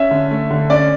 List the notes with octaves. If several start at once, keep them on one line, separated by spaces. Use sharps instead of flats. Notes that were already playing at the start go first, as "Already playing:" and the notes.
Already playing: C#4 E5
D3
A3
D3
C#4 D5